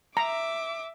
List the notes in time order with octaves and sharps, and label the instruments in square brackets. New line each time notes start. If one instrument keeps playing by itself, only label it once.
[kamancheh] E5 D6 [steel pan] A#5